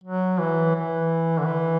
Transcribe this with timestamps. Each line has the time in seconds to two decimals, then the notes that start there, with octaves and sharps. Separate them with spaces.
0.04 F#3
0.40 E3
0.76 E3
1.39 D3
1.47 E3